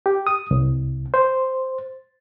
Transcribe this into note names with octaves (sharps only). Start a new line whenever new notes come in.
G4
D#6
C2
C5